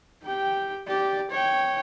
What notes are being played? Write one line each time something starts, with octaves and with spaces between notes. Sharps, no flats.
G4 G5
G4 D5
C#5 G5